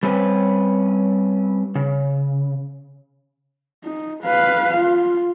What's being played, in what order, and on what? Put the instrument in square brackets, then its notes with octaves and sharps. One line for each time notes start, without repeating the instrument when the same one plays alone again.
[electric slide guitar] G3 C4 C#4 B4
C#3
[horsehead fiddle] D#4
B4 F5
F4